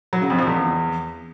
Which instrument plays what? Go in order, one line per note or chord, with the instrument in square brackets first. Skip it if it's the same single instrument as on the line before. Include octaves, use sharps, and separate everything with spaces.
[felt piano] F#3
C#3
F2
F3
E2